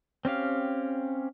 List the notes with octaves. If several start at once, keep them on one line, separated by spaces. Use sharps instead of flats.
C4 C#4 G4 F5